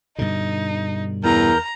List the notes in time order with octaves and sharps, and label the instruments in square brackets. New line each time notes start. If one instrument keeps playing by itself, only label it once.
[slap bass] G2 B2 D3 [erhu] D#4
[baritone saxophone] E2 [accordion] A#4 F6 G6 [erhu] A#5